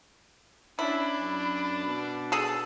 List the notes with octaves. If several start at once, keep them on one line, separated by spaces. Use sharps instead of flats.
C#4 D4 E4 B5
F#2
B2
G#4 A4